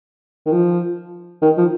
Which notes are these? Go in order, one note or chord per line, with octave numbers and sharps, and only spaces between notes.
D#3
F3
D#3
F3